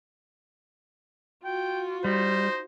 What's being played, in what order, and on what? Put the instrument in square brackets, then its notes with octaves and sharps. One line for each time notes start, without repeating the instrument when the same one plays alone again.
[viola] F4 F#4 [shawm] G5
[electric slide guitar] G3 [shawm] D#4 [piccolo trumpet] C5